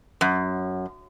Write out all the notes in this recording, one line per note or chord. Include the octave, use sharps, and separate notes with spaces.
F#2